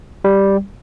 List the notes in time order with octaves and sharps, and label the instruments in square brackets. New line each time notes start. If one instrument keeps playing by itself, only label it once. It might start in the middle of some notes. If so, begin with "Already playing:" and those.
[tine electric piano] G3